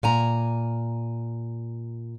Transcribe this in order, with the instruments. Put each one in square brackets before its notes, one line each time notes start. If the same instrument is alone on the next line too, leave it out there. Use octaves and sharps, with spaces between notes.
[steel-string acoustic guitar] A#2 G#5 A#5